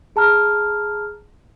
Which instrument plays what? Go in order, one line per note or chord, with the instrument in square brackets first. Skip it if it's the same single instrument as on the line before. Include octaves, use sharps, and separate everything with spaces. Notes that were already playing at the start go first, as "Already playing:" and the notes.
[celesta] G#4 A5 A#5 F6